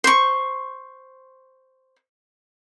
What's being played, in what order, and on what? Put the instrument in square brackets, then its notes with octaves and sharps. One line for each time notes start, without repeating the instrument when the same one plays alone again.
[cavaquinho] C5 C#6